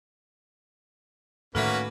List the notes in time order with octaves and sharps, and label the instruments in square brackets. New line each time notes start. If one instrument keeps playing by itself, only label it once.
[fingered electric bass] A2 D#3 [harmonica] A#3 C#4 F#4 [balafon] A4 E5 [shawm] B4